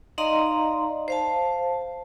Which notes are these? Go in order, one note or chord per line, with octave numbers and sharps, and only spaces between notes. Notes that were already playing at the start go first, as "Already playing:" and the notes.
D#4 D5 D#5 F5 A#5 C6
C5 F5 A5